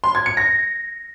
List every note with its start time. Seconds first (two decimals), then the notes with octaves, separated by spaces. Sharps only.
0.04 C6
0.15 G#6
0.26 C#7
0.37 A#6